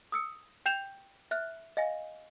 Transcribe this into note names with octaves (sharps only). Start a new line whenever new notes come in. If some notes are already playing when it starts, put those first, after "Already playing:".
D#6 E6 C#7
G5 G6 E7 F7
E5 F6 F#6
D#5 F5 G#5 A#6